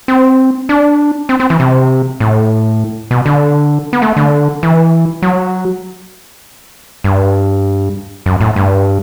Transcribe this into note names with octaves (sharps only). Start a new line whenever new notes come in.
C4
D4
C4
C4
E3
C3
A2
B2
D3
B3
A3
D3
E3
F#3
G2
F#2
A2
G2